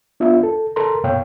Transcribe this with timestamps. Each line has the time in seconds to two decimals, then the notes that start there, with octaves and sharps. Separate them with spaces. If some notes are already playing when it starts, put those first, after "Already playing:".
0.20 B3 D4 F4 E5
0.43 A4
0.76 A4 A#4 A#5 C6
1.04 F#2 B2 C#5 F5 G5